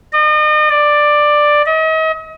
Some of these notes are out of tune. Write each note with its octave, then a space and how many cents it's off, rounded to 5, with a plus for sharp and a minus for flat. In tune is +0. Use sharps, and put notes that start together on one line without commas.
D#5 -40
D5 +10
D#5 +40